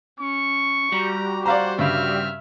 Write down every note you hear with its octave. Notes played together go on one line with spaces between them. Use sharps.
C#4 C#6
G3 F#4 G4 A#5
C5 D5 F5 F#5 A#5
G2 C#3 C4 E5 F6